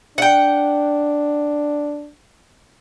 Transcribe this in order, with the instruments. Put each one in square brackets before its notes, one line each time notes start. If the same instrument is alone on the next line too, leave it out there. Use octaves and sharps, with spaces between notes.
[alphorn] D4 [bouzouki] F#5 G5